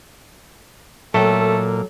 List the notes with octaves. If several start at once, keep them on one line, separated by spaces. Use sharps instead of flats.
A#2 F#3 A3 A4 D#5 G5